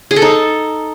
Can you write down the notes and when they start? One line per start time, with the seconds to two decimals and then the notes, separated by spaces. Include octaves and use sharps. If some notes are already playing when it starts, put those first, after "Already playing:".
0.11 G#4
0.16 A4
0.22 D#4